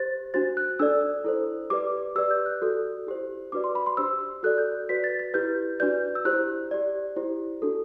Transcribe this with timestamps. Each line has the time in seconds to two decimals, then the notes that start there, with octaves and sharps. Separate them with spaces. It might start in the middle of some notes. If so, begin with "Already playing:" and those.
Already playing: G4 C5 A6
0.34 D4 F#4 C5 A6
0.57 F#6
0.79 D4 A4 D5 E6
1.24 E4 A4 C5
1.70 G4 B4 D5 D6
2.16 G4 B4 D5 E6
2.31 G6
2.46 F#6
2.62 F#4 A4 D5
3.07 E4 G4 C5
3.52 D4 F#4 B4 D5 D6
3.64 C6
3.75 B5
3.86 C6
3.97 D4 G4 C5 E6
4.43 F#4 A4 D5 F#6
4.58 G6
4.89 F#4 B4 D5 B6
5.04 A6
5.19 A6
5.34 E4 G4 B4 G6
5.80 D4 F#4 B4 D5 G6
6.15 E6
6.25 E4 G4 C5 F#6
6.71 G4 D5
7.16 E4 G4 C5
7.62 D4 F#4 A4